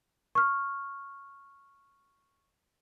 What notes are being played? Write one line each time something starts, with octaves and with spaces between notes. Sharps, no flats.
C#6 F6